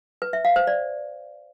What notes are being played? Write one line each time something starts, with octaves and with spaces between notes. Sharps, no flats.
B4
E5
F5
C5
D5